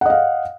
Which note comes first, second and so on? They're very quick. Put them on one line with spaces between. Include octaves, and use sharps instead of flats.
F#5 D#5 F5